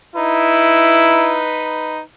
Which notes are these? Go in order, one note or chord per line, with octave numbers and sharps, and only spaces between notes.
D#4 E4 B4